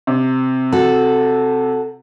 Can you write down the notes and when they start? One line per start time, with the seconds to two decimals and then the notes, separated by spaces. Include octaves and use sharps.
0.07 C3
0.72 F#4 A4